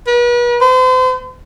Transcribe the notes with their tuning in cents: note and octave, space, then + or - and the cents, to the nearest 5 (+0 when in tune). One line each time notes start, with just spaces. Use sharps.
B4 -40
C5 -40